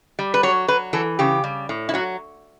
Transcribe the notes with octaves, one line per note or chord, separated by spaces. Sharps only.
G3
B4
F#3 C#5
F#3 B4
E3 A4
C#3 G4
G3
A2
E4
F#3 F#4